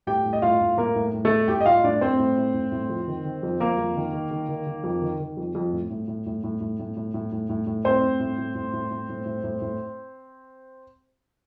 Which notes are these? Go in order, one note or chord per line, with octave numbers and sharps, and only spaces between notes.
A2 G4 G5
A2
D#5
A2 F4 F5
A2
A2 A#3 A#4
A2
A2
A3 A4
A2
A2 G4 G5
D#5
A2 F4 F5
A2 D4 D5
A2 C4 C5
A2
A2
A2
A2
F2
D#3
D#3
F2
F2 A#3 A#4
F2
D#3
D#3
D#3
D#3
D#3
F2
D#3
D#3
F2
F2
A2
A2
A2
A2
A2
A2
A2
A2
A2
A2
A2
A2
A2 C4 C5
A2
A2
A2
A2
A2
A2
A2
A2
A2
A2